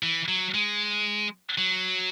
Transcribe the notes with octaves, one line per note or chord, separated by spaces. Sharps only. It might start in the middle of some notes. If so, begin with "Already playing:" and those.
E3
F#3
G#3
F#3